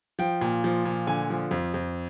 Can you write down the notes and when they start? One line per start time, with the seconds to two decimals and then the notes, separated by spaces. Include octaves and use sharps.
0.19 F3 G5
0.41 A#2
0.64 F3
0.85 A#2
1.07 D3 G#5
1.30 F3
1.51 F2
1.74 F2